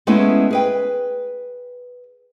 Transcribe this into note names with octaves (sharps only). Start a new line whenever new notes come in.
G#3 A3 B3 C#4 E4 G#4
G#4 B4 G5